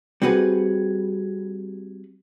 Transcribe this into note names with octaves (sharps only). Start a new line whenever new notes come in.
G3 C4 F#4 G#4 B4